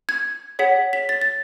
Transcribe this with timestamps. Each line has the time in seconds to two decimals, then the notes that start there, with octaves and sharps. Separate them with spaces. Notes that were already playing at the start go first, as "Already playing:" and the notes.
0.09 G#6
0.59 G#4 C#5 F#5 B6
0.93 B6
1.09 A6
1.22 A6